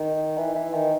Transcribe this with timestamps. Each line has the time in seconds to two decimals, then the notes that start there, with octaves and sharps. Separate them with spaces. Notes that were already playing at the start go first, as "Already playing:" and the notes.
Already playing: D#3
0.38 E3
0.55 E3
0.74 D#3